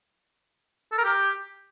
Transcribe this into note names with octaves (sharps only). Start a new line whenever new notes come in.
A4
A#4
G4